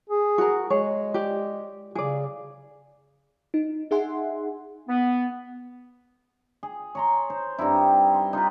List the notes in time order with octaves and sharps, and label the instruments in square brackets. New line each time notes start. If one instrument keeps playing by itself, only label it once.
[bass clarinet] G#4
[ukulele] F#4 A#4
[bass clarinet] G#3 [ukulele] G#4 C#5
[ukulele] G4 D5
[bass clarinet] C#3 [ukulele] G#4 D5
[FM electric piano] D#4
D#4 G#4 E5 F#5 G#5 C6
[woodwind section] B3
[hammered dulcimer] G#4
C#5 A#5 C6
C5
G2 C4 D#4 E4
C6
D#4 F4 G4 B4